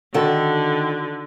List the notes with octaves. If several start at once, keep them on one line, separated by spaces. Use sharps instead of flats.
D3 D#3 F#4 A4